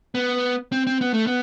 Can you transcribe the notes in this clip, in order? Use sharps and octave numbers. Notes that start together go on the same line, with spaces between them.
B3
C4
C4
B3
A3
B3